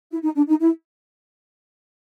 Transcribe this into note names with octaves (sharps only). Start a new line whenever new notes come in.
E4
D#4
D4
D#4
E4